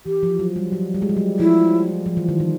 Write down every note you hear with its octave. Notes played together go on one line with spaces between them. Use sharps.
E3 G4
F3
F#3
G3
F#3
G3
G#3
G3
F#3
F3 E4
F3
E3
D#3
E3